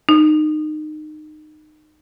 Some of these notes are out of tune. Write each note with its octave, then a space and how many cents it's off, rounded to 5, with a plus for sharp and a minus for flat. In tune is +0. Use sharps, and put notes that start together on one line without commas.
D#4 -25